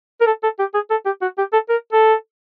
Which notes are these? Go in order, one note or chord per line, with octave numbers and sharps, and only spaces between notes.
A#4
A4
A4
G4
G#4
A4
G4
F#4
G4
A4
A#4
A4